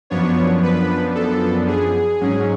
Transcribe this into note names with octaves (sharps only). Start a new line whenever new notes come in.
F#2 F3 B3 D4 C#5
B4
A4
G#4
G#2 F#3 C#4